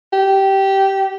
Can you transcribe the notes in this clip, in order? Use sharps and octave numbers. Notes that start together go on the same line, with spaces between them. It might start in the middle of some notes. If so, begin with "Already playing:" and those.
G4